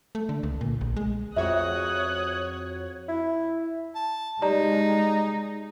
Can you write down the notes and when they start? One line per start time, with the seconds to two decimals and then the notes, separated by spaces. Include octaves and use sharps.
0.15 A3
0.29 D3
0.43 C#2
0.61 A#2
0.81 A#1
0.96 G#3
1.36 F2 F#4 G#4 C#5 E5 D#6 F#6
3.08 E4
3.95 A5
4.42 G#3 D#4 G4 D5 A#5